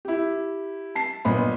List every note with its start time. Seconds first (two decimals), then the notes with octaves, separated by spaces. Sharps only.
0.05 E4 G4
0.95 A5 C7
1.25 G1 A#2 B3 D#5 B5